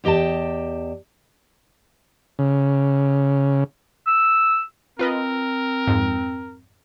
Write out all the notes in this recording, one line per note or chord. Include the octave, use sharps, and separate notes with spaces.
E2 G4 D#5 G5 A5
C#3
E6
C4 F4 A#4 B4 D#5
F2 G#2